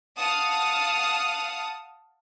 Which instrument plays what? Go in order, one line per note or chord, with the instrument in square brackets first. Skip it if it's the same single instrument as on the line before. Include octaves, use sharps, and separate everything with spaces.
[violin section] F5 F#5 A5 D#6